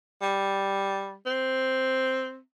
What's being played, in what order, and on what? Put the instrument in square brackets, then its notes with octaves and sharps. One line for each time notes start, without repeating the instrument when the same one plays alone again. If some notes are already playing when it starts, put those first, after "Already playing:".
[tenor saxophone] G3
C4